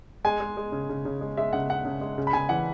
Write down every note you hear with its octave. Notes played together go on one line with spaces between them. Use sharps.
G#3 G#5
G#3
G#3
C#3
C#3
C#3
G#3
G#3 E5
C#3 F#5
G#3 F#5
C#3
G#3
C#3
B5
C#3 G#5
E3 F#5